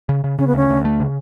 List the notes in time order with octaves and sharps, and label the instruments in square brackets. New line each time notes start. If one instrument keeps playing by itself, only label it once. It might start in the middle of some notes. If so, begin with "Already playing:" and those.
[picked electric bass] C#3
C#3
[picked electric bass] C#3 [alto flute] C#4
[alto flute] B3
[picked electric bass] D2 [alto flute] C#4
[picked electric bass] D2
A3
C#3